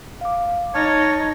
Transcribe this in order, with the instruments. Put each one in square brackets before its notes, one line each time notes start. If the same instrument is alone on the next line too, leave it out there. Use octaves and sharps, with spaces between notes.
[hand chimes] F5 D6
[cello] D#4 [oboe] C#5 [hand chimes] A5 F6 A6